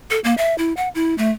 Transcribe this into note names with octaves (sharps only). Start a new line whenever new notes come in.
A4
A#3
E5
E4
F#5
E4
A3